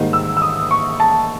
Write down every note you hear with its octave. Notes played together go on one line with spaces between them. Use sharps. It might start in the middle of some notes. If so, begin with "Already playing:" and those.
Already playing: G#2 D#3 G3 A#3 D#4
E6
E6
D#6
C#6
A5